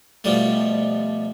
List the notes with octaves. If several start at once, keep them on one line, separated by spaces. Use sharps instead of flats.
B2 F3 G3 A3